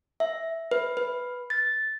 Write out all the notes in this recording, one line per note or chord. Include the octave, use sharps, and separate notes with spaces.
E5
B4
B4
A6